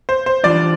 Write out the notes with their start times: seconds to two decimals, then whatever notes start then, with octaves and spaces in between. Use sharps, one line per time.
0.09 C5
0.26 C5
0.44 E3 G3 D4 F4 C5 D5